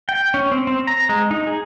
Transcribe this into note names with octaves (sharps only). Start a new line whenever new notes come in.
G5
C#4
C4
C4
A#5
G#3
D#4
G#4